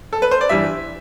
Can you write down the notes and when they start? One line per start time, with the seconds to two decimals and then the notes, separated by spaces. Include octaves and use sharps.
0.13 A4
0.22 B4
0.31 C5
0.41 D5
0.49 G2 E3 G3 E5